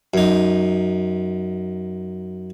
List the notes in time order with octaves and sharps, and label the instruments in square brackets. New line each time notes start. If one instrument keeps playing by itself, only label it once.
[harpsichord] F#2 D#4